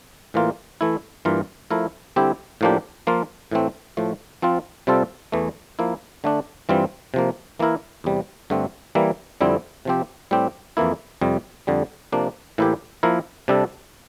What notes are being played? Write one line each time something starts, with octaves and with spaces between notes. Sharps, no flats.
A2 E3 A#3 F4
E3 A3 E4
G2 E3 A#3 F4 A#4
F3 A3 E4 A#4
D3 G3 C4 E4 G4
A2 F3 A#3 D4 G4
F3 A#3 F4
A2 E3 A3 C4
A2 F3 A3
F3 C4 F4
C3 G3 C4 F4 A4
E2 E3 A3
F3 A#3 E4
D3 A3 D4
G2 E3 G3 C4 F4
C3 F3 A#3
E3 A#3 E4 A#4
E2 C3 G3
G2 D3 A3 C4
E3 G3 A#3 E4
F2 D3 G3 C4 E4
C3 F3 C4 G4
A2 G3 C4 G4
F2 E3 A#3 E4
F2 C3 G3
F2 D3 G3
C3 F3 A#3 D4
A2 E3 A#3 E4 G4
F3 A#3 E4 A#4
C3 G3 D4 A4